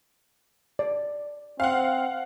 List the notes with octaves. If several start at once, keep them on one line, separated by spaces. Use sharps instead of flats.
D5
C4 F5 F#5